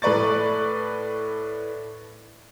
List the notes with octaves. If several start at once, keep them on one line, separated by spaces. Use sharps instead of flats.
A2 A4 B4 D5 C#6 A6